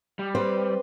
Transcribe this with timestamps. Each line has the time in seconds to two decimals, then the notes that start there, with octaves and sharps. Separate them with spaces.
0.19 G3
0.35 C4 B4 C5